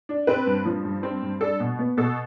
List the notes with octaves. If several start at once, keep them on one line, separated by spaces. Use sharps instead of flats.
D4
C4 B4
G2
F3
G2
C4
G2
D4 A4
B2
B3
B2 A4